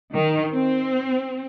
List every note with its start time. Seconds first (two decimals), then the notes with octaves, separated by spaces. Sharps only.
0.12 D#3
0.51 C4